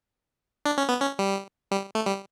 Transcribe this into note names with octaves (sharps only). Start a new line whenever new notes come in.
D4
C#4
B3
C#4
G3
G3
A3
G3